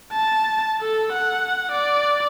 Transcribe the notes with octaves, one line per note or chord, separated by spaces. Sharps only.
A5
A4
F#5
D5